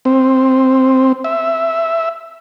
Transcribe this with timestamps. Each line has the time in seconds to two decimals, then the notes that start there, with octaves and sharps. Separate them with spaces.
0.05 C4
1.24 E5